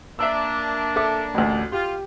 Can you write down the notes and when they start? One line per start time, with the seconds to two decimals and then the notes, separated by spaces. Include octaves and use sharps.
0.19 A#3 D4 E5 D6 E6
0.96 A4 E5 D6
1.34 A1 D2
1.72 F4 G4